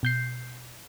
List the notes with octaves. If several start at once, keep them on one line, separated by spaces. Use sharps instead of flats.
B2 G6 C7